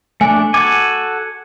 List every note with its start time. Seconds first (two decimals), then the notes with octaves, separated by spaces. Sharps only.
0.21 A3 D4 G#5
0.54 F#4 A4 G#5 D6